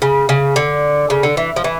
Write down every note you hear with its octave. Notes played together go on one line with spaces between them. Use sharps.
C#3
C#3
D3
C#3
D3
E3
F3
E3